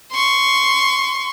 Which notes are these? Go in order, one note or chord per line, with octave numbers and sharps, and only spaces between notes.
C6 C#6